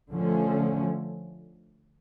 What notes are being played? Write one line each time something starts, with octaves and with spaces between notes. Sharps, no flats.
D3 F3 A3 C#4